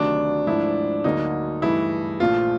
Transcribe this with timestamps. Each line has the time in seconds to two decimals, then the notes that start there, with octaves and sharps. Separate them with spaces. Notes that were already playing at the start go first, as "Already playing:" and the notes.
Already playing: D2 C3 D#3 F#3 A3 D4
0.47 G#2 F3 A3 D4 E4
1.04 D2 D3 F#3 A#3 D#4
1.62 G2 E3 A3 E4
2.20 A#1 A#2 F3 A3 F4